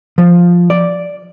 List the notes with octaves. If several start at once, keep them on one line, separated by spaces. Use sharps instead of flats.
F3
D5